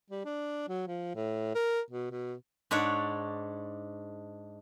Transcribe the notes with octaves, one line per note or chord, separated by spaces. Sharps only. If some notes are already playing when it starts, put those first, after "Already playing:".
G3
D4
F#3
F3
A2
A#4
B2
B2
G#2 D4 C#5 D5 F#5